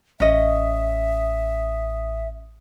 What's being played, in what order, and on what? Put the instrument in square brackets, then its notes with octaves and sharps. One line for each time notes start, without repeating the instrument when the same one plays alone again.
[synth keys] A1 D#6 [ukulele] C#4 D#5 [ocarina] E5